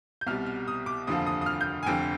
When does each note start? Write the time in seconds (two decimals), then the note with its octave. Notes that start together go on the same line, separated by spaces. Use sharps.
0.21 G6
0.26 C2 B2 G3 F6
0.46 F6
0.68 D#6
0.86 D6
1.07 F1 D#2 D3 F3 D#6
1.27 D#6
1.41 D#6
1.46 F6
1.61 G6
1.83 G#5
1.87 F1 F2 D3 G5